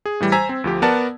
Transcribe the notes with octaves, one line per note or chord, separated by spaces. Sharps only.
G#4
A2 E3 G3
C5 G#5 A#5 E6 G#6 B6
C4
D2 F3 G4
B3 A#4 D5 F#5 A5